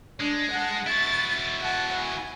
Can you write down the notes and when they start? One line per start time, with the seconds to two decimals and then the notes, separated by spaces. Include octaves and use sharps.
0.20 G#3 D4
0.51 F#5 A5
0.87 E4 F#4 A6
1.61 F#5 A5
1.99 G#5